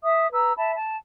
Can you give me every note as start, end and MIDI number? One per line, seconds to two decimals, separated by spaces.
0.04 0.28 76
0.04 0.28 87
0.32 0.53 71
0.32 0.53 82
0.32 0.53 88
0.57 0.75 76
0.57 0.75 81
0.57 0.75 83
0.76 0.96 81